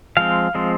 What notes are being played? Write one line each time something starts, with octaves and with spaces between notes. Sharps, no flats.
F3 G#3 C4 F5
F3 G#3 C4